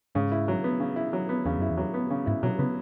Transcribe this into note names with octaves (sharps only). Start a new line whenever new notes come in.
G#2 C#3
E4
F#3
B3
C#3
E4
F#3
B3
E2 C#3
F#2 E4
E2
F#3
B3
C#3
G#2 E4
B2 F#3
C#3 B3